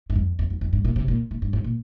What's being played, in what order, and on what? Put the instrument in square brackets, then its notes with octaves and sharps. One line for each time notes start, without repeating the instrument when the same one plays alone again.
[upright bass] G2
F2
F2
F2
F2
G2
A#2
C3
A#2
A#2
G2
G#2
A#2